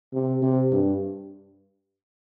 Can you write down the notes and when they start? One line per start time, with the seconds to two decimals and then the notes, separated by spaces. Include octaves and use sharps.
0.14 C3
0.42 C3
0.72 G2